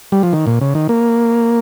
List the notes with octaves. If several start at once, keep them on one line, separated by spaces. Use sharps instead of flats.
G3
F3
D#3
A#2
C#3
D#3
A#3